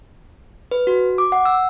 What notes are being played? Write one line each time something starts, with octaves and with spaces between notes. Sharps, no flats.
B4
F#4
D6
F#5
E6